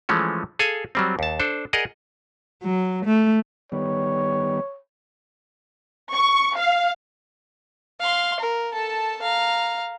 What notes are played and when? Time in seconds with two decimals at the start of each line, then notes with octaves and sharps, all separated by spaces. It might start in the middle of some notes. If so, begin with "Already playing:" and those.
0.09 E3 F3 G#3 A3 C#4
0.59 G#4 A4 F5 G#5
0.95 F#3 G3 C4
1.19 D#2 A5
1.40 D4 A4 C5
1.73 G#4 A#4 D5 D#5 F#5
2.63 F#3
3.06 A3
3.72 D#3 G3 B3 C#5
6.11 C#6
6.56 F5
8.00 F5 C6
8.40 A#4
8.74 A4 A5
9.22 F5 A#5